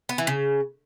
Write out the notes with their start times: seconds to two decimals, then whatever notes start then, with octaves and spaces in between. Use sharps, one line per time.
0.09 B3
0.18 E3
0.27 C#3